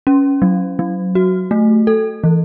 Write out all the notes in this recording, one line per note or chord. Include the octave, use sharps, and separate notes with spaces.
C#4
F#3
F#3
F#4
A3
A4
E3